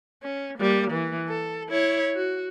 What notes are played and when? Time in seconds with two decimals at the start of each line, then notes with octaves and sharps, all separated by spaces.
0.23 C#4
0.58 G3 A#3
0.91 E3
1.28 A4
1.69 E4 C#5
2.15 F#4